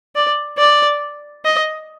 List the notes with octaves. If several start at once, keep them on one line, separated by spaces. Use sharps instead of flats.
D5
D5
D#5